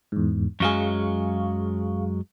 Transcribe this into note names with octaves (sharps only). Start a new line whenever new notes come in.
E2 G#2
F#2 F#3 G#3 G#4 F5 C#6